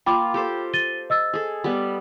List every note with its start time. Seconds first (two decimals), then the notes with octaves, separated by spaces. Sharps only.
0.06 A#3 F4 G5 B5 D6
0.34 G4 A4 C5
0.74 A6 D#7 G7
1.10 D#5 E6 A6
1.34 G#4 A4
1.64 G3 B3